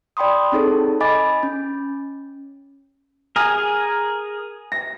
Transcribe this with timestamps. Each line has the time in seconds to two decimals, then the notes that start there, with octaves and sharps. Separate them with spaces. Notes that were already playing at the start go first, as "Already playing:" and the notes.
0.17 D5 G5 B5 C6 D#6
0.52 C4 D#4 G#4 A4 C#5
1.01 D#5 G#5 B5 D6 A6
1.43 C#4
3.36 G#4 A#4 G#5 F6
4.72 A#6